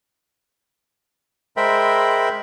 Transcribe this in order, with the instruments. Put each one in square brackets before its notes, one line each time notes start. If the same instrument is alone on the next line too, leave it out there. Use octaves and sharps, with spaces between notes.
[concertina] G#3 A#4 C5 E5 G5 B5